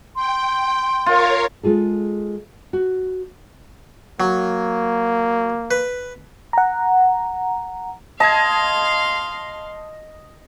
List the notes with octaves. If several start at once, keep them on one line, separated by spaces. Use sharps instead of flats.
G5 C6
F4 A#4 C#5 F5
G#3 F4 G#4 A4
F#4
F#3 A#3
B4
F#5 A#5
D#5 F5 A5 C6 G#6